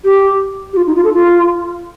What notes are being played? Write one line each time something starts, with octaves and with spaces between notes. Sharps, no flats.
G4
G4
F4
D#4
F4
A4
F4